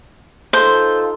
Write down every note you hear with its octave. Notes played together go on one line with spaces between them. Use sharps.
D#4 F4 A4 C5